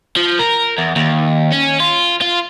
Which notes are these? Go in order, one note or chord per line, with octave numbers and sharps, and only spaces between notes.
F3
A#4
E2
D#2
C#4
F4
F4